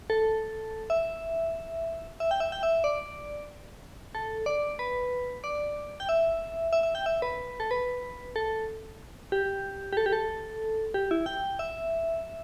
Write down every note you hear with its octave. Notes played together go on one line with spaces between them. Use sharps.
A4
E5
E5
G5
E5
G5
E5
D5
A4
D5
B4
D5
G5
E5
E5
E5
G5
E5
B4
A4
B4
A4
G4
G4
A4
G4
A4
G4
E4
G5
E5